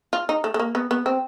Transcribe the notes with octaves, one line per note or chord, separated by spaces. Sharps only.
F4
D#4
A3
A3
A#3
B3
B3
C4